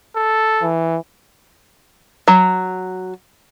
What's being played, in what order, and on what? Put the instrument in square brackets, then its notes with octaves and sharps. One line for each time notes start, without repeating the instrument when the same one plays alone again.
[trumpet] A4
[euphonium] E3
[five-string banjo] F#3